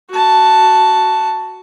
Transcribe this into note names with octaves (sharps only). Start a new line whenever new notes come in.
F#4 A5